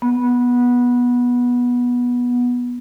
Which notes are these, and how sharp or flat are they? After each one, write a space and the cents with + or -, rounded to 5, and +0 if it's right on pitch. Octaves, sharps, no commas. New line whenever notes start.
B3 -15